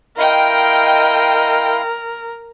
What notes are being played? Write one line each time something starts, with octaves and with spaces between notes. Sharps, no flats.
E4 A#4 D#5 F5 G5 C6